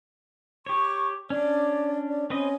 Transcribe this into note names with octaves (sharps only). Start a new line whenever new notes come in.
G4 C#5 C#6
C#4 D4 D5
D5
C4 C#4 B4 D#5